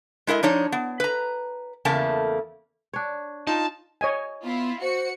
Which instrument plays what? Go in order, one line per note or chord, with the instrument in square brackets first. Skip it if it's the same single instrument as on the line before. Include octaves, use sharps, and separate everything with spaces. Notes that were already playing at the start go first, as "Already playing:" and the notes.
[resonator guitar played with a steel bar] G#3 E4 A#4 D#5
F3 D4 D#4 C#5
B3
B4 A#5
E2 C#3 A3 A#3 A5
[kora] D4 C#5
[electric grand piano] D#4 F4 [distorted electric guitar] A5
[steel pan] C#5 D#5 G#5
[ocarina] B3 [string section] E4 F4
[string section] F#4 C#7 [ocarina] C5